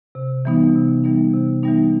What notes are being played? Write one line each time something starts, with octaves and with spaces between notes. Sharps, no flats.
C3
E3 G3 B3 D#4
C3
E3 G3 B3 D#4
C3
E3 G3 B3 D#4